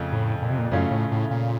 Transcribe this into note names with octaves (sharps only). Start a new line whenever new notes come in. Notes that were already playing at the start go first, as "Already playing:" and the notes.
Already playing: F2 C#3 A3
A2
A#2
C3
A#2
F#2 C#3 A3 C#4 F4
A2
A2
A#2